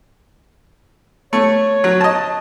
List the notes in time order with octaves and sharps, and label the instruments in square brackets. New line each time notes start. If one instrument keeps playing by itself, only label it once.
[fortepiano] A3 [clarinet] C#5
[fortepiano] F#3
D#5 A5